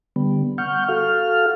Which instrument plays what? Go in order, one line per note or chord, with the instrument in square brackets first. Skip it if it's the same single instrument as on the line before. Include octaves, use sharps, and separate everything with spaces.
[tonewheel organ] D3 G3 B3
F#5 C#6 F6 G6
F#4 A4 F5 F6